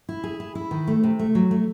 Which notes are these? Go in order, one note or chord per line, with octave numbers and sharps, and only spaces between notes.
E4
G#4
E4
E4
D#3
A3
C3
A3
F#3
A3